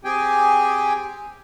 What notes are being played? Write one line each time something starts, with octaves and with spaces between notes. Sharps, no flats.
C4 G4 G#4 G5 G#5